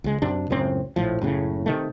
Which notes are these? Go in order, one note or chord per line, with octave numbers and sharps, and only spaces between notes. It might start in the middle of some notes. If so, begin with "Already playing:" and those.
C#2 G#3
F#2 C3 D4
C#2 F#2 A2 C4
A#1 A2 F3
F#1 A2 C#3
C3 D#3 A3